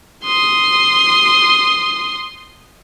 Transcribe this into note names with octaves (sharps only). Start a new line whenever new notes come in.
C6 D#6